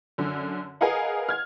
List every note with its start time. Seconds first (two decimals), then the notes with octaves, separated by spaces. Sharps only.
0.18 F#2 D3
0.81 G#4 A#4 B4 D#5 F5 F#5
1.29 F6 G#6